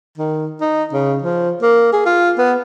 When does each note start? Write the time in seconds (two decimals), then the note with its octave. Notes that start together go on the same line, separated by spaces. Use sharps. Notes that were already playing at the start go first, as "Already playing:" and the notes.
0.18 D#3
0.61 D#4
0.93 C#3
1.22 F3
1.62 A#3
1.93 G#4
2.06 F4
2.38 B3